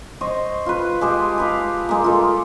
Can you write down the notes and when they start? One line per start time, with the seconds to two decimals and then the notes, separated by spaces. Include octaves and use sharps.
0.21 C5 D#5 C#6
0.66 F4 B4
1.01 G#3 G4 A5
1.38 G4 B4 F5
1.89 G#3 A#3
2.04 F4 A4